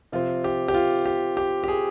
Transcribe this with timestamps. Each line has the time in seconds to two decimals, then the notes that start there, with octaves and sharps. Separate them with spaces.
0.12 C3 F3 C4 F4
0.44 G4
0.68 G4
0.74 F4
1.05 G4
1.37 G4
1.64 G4
1.68 G#4